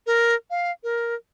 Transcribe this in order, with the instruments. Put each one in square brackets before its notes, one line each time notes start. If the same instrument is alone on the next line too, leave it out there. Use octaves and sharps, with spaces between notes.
[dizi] A#4
F5
A#4